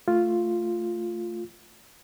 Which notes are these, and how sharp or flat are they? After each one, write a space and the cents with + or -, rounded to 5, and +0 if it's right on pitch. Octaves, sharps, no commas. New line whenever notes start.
A3 +10 F4 +0